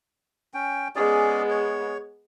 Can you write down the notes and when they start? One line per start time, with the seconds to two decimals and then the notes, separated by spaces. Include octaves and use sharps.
0.54 C#4 G5
0.96 G#3 B3 C#4 G#4 D5
1.50 C#5